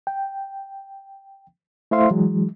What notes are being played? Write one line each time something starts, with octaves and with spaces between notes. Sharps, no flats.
G5
A3 E4 C5 E5 F5 C6
E3 F#3 G#3